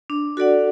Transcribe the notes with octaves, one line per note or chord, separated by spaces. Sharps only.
D4
F#4 A4 D5 F#5